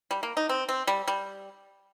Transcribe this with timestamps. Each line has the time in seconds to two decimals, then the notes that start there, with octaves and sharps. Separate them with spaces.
0.11 G3
0.23 A#3
0.37 D#4
0.49 C4
0.69 C4
0.87 G3
1.08 G3